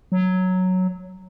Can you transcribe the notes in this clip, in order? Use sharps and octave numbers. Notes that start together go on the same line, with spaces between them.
F#3